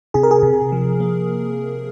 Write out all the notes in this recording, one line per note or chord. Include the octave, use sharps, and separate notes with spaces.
C3 G#4
A#4
G#4
C3
F3
A#3